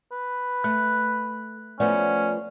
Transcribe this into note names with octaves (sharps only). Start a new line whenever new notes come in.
B4
A3 F#6
F3 A3 B3 C#4 D5